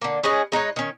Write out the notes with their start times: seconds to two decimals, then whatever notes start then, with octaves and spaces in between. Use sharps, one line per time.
0.01 D3 A#3
0.23 C#4 G#4 B4 D#5
0.52 G#3 D#4 B4 C#5
0.76 D#3 C#4